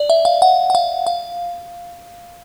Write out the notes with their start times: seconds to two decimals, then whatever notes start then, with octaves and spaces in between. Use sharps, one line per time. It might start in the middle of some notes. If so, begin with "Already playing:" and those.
Already playing: D5
0.10 E5
0.25 F5
0.42 F#5
0.70 F#5
0.75 F5
1.07 F5